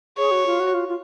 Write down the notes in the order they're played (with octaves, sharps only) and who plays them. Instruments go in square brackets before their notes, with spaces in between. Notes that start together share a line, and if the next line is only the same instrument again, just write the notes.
[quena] G#4 [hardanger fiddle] C#5
[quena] F#4
F4
F#4
F4
F4